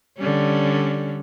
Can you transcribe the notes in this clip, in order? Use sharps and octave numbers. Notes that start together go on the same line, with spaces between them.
D3 G3 C#4